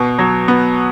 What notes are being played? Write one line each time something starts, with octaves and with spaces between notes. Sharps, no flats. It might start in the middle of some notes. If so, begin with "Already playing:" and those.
Already playing: B2
F#3
B3